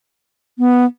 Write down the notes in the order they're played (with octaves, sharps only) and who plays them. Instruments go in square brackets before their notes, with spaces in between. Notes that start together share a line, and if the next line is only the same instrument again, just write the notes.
[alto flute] B3